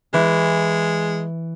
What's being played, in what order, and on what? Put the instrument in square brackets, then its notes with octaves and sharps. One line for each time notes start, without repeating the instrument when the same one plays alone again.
[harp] E3 [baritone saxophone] G#3